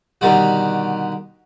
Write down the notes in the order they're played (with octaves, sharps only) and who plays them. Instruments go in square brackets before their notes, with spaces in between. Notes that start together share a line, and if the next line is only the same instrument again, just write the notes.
[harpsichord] B2 D3 D#3 G3 F#4